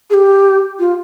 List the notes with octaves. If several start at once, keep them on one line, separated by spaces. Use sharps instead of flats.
G#4
G4
F4